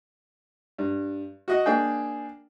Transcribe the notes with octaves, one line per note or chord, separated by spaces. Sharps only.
G2
F#4 D#5 F#5
A#3 D4 G#4 G5